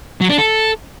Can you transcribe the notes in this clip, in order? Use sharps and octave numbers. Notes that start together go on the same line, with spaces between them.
F#3
D4
A4